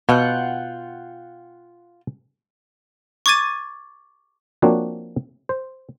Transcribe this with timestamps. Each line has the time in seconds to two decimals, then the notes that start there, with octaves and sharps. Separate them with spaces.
0.09 B2 F4 F#5 G5
3.26 C#6 D6 G#6 A6 D#7
4.62 F3 A#3 C4 D4 F#4 C#5
5.49 C5